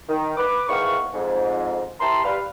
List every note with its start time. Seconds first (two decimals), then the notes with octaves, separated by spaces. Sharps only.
0.09 D#3
0.37 B4 D6
0.69 E2 G#2 D#3 F5 F#5 C#6
1.13 F2 G#2
2.00 E4 G4 A#4 A5 C6
2.24 G3 B4 F5